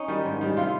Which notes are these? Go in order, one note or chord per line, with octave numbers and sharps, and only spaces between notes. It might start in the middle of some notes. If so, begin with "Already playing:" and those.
Already playing: C#4 D#4
D#3 G3
G#2
D#3 G3
C3 F4